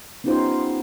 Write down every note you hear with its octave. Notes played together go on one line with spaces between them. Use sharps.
B3 C#4 D#4 F4 G4 C5